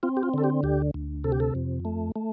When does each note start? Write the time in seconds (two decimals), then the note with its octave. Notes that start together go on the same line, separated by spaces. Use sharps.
0.03 C4 F4
0.17 G4
0.23 F4
0.34 D3 A4
0.44 G4
0.63 D2 G4
0.94 D2
1.24 C3 A4
1.32 G4
1.40 A4
1.55 F2
1.85 A3
2.16 A3